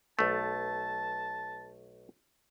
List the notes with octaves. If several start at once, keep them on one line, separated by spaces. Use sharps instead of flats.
B1 A3 A5